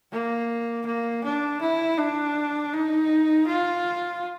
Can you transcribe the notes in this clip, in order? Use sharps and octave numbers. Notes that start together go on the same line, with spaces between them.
A#3
A#3
D4
E4
D4
D#4
F4